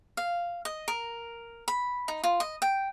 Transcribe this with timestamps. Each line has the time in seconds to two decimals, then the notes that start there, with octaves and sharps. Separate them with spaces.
0.17 F5
0.65 D#5
0.88 A#4
1.68 B5
2.08 D#4
2.24 F4
2.40 D#5
2.62 G5